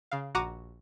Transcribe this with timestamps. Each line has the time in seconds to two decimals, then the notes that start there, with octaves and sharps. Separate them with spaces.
0.12 C#3 F5
0.35 A#1 F#4 F#5 A#5 D6 D#7